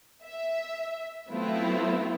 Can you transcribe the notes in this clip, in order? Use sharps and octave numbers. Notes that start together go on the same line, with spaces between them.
E5
F#3 A3 B3 C4 E4 F4